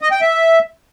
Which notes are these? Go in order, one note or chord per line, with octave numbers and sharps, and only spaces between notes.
D#5
G5
E5